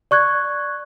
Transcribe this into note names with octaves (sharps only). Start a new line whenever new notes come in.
D5 C#6 F#6 G#6